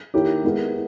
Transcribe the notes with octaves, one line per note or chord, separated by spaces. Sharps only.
D#3 A#3 E4 G4 C#5
G#3 B3 E4 A#4